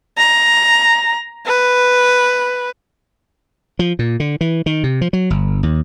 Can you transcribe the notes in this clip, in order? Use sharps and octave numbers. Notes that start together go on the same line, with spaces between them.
A#5
B4
F3
A#2
D3
E3
D#3
C3
F3
F#3
G1
D#2